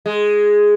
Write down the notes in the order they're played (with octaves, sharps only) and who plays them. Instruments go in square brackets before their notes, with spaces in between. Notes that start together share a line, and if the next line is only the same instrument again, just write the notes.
[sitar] G#3